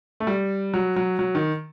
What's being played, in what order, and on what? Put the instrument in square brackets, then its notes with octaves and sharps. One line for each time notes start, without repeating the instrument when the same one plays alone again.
[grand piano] A3
G3
F#3
F#3
F#3
D#3